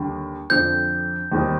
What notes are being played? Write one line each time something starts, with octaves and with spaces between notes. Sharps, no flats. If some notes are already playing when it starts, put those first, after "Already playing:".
Already playing: D#2 D3 G3
F2 D3 F3 C4 G6
D#2 D#3 G3 C4 D#4